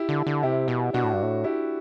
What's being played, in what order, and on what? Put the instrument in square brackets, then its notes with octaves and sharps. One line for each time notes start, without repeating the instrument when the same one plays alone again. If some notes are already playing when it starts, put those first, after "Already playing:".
Already playing: [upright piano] E4 G4
[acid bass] D3
D3
[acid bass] C3 [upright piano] E4 G4
[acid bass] B2
[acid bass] B2 [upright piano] D4 F#4
[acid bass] A2
G2
A2
[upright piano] E4 G4